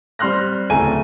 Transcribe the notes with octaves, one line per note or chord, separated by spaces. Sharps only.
G3 C4 C6 F6 F#6 A#6
D1 C#3 A3 G#5 A#5 D#7